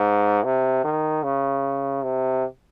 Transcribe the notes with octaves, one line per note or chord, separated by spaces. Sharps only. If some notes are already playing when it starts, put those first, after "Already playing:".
Already playing: G#2
C3
D#3
C#3
C3